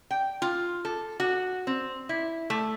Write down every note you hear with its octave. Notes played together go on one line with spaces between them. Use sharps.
G5
F4
A4
F#4
C4
E4
A3